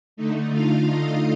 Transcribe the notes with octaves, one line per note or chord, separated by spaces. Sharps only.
D3 A3 D#4
F4 F5
D#4 D#5